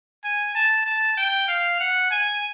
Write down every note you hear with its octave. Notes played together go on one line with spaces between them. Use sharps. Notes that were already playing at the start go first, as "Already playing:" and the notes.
G#5
A5
A5
G5
F5
F#5
G#5